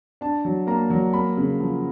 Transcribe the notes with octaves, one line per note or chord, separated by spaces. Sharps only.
D4 A5
F#3
A#3 A#5
F#3
A#3 B5
C#3
F3